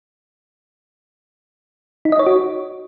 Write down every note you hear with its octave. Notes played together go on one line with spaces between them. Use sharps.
D#4
D#5
C#5
F#4